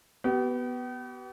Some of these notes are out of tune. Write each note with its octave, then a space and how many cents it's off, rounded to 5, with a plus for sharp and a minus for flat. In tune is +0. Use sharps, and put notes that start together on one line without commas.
B3 +0 G4 -45